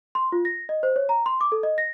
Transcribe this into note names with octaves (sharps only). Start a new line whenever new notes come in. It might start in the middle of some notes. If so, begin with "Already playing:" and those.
C6
F4
A#6
D#5
C5
C#5
A#5
C6
D6
A4
D#5
A#6